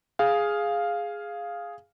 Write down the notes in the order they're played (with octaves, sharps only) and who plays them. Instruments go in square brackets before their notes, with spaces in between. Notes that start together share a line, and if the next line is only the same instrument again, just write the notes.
[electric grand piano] G#4 F5